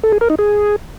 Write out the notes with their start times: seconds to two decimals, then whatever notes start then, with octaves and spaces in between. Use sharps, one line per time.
0.04 A4
0.12 G#4
0.21 A#4
0.30 D#4
0.39 G#4